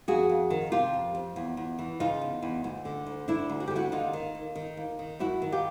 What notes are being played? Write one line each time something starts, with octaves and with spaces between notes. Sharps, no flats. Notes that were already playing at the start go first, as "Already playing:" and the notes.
F2 F#4 G#4
F2
D#3
C3 F4 G4
F2
F2
E2
E2
E3
C#3 D#4 F4
E2
E2
D2
D3
D2
D3 D4 E4
D2
F#4
G4
D3
E4 F#4
D#2 D#4 F4
D#3
D#2
D#3
D#2
D#3
F#2 E4 F#4
D#3
F4 G4